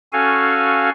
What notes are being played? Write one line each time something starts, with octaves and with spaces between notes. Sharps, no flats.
C#4 F#4 A4 F5 G#5